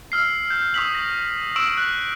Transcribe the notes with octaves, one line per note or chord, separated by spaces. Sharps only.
E6 F6 C7
G6
C#6 D#6 E6 B6 F#7
A#6
C#6 E6 D7 E7 F#7
F#6